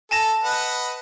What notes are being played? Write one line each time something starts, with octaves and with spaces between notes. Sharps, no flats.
A4 G#5 A5 A#6
B4 D#5 F#5